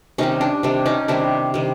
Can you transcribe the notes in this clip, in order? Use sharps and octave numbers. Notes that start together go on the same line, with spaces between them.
C3 D#3 G3 C#4 D#4
D4
C3 D#3 G3 D4
C#4 D#4
C3 D#3 G3 D4 E4
C3 D#3 G3